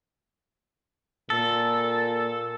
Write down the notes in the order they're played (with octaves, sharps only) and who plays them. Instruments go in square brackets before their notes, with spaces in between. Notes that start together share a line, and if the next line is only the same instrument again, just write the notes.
[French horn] A#2 [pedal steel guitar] A4